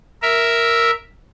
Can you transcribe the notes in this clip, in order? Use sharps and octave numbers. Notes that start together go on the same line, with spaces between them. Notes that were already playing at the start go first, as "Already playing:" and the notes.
A#4 E5